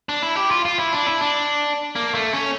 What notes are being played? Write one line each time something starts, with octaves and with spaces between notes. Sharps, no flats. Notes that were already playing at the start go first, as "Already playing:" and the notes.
D4
E4
G4
F4
F4
E4
D4
E4
D4
A#3
A3
C#4